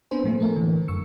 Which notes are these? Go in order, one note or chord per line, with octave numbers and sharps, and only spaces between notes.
B3 C4 D4 B4 C5 G#5
A2 F3 A3 A#3
A4 A#4
D3 E3
F#2 C#6 E6 C#7